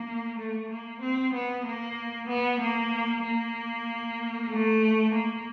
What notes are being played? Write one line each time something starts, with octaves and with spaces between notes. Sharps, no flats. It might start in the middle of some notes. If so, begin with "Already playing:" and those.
Already playing: A#3
A3
A#3
C4
B3
A#3
B3
A#3
A#3
A3
A#3